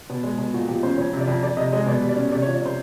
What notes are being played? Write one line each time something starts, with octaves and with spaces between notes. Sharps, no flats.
B2
G#3
B2
A#2 F#4
F3 G4
C#4 C5
F2 C#5
C3
D5
F2
F2 D5
C3 D#5
G#3 D#5
B2 D5
G3
D5
C#4
C3 D5
C#5
F3
D5
C3 C5